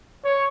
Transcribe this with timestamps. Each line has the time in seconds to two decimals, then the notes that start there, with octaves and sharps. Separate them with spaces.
0.24 C#5